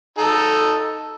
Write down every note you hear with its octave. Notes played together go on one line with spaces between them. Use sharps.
D#4 A4